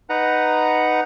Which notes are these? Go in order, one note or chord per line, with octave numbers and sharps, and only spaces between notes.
D#4 B4 F#5 A#5